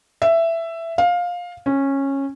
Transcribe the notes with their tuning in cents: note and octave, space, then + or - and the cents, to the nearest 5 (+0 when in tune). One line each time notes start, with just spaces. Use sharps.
E5 +10
F5 +15
C#4 -15